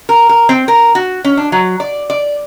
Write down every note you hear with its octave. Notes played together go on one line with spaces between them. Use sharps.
A#4
A#4
C4
A#4
F#4
C#4
D4
F#3
D5
D5